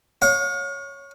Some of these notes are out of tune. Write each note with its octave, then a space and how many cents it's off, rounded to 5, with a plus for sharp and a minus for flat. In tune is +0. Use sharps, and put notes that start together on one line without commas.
C#5 +0 F5 +40